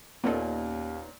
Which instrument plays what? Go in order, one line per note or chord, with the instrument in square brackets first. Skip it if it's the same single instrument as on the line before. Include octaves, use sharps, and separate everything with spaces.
[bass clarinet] D#2 [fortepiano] A#2 [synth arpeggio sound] A#3 A4 [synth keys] B3 C#4 D#4